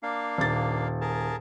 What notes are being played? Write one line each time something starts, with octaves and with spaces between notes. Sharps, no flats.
A#3 D4 F5
D#1 A6
G#4 A#4 A5